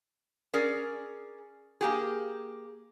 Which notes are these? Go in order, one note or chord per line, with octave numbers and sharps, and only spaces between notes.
C#4 G#4 A#4 D5
A#3 G4 G#4